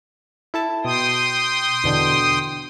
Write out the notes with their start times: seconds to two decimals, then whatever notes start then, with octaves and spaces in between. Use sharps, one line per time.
0.54 E4 A4 A5
0.84 B2 G5 C6 D#6
1.84 E2 B2 D3